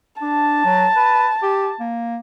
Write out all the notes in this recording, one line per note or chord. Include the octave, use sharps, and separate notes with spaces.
D4 A5
F#3
B4
G4
A#3